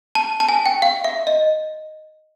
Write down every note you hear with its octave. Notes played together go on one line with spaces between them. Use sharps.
A5
A5
G#5
G5
F5
E5
D#5